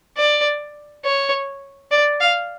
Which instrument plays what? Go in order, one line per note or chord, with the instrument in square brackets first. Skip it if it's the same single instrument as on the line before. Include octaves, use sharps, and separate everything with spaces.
[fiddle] D5
C#5
D5
F5